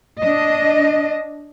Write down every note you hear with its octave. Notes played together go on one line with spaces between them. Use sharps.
D4 D#5